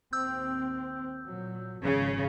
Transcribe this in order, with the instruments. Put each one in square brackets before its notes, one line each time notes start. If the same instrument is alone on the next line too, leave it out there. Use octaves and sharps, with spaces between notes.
[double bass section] D#2 C4 [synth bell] E6 G6
[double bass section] A#2 F#3
[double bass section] G#1 F3 [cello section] C#3